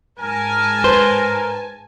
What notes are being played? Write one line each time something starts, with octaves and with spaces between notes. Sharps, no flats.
G#2 A#4 G#5 A5
B4 C5